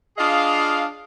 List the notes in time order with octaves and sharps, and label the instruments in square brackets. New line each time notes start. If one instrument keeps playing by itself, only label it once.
[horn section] D4 F4 G#4 D#5 F5